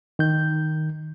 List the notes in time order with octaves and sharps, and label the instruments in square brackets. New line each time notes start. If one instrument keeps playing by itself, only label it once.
[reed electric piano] D#3 G6